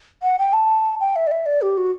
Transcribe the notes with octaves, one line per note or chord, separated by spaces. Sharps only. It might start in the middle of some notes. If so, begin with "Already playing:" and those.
F#5
G5
A5
G5
E5
D5
E5
D5
G4
F#4